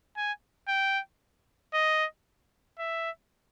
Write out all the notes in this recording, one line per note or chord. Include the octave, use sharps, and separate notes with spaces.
G#5
G5
D#5
E5